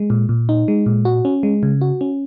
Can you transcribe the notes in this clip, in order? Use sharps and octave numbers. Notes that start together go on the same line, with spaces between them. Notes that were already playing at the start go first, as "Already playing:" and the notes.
Already playing: G#3
A#2
A#2
D#4
G#3
A#2
F#4
C#4
G#3
C#3
F#4
C#4